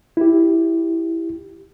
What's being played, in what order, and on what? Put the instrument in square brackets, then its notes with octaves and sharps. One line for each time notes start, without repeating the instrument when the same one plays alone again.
[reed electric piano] E4 G4